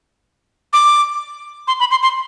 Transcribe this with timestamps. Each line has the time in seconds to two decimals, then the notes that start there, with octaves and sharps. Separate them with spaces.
0.73 D6
1.68 C6
1.80 B5
1.91 C6
2.03 C6